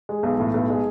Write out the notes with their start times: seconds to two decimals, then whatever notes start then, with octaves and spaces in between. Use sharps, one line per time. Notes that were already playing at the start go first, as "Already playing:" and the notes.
0.09 G#3
0.23 B1
0.40 A2
0.54 B1
0.70 G#3